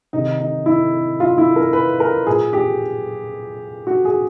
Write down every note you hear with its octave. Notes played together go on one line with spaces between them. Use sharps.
C3 D#3 D#4
D#4
E4
F4
E4
A#4
B4
A#4
A#2 G#4
G4
F#4
G#4